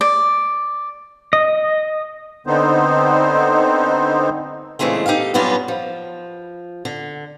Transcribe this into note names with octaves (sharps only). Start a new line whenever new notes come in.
D5
D#5
D3 B3 C4 D#4 C5
A#2 C#3 E3 G#3 A3 C4
D#4 G4 A4 F5
G2 F#3 G3 B3 C#4 F4
F3
D3